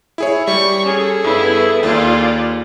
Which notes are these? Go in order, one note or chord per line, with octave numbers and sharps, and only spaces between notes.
E4 G#4 C#5
G3 C#6
C#4 G#4 A4
G2 B3 E4
D#2 F4 D5